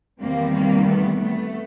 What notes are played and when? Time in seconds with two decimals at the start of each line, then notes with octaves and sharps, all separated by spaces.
0.21 E2 C3 D#3 G3 A#3 C4
0.54 A#3
0.86 A3 B3
1.18 A3 B3